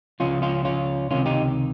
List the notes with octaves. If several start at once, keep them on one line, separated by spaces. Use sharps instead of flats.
C#2 C#3 F3 C#4 F4
C#4 F4
C#4 F4
C#2 C3 D#3 C#4 F4
D#4 G4